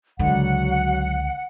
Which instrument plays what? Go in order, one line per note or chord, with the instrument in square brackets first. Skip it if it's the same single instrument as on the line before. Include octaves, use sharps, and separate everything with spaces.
[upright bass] C#2 D3 [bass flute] F#3 [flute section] F#5